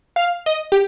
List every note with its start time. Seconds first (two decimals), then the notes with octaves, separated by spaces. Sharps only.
0.16 F5
0.46 D#5
0.72 G4